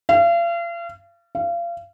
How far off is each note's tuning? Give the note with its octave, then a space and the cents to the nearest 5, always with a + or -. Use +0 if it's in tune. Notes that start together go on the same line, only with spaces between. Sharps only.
F5 -40
F5 -30